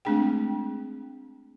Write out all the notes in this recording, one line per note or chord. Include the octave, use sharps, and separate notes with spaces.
G#3 A3 C4 D4 G#4 G5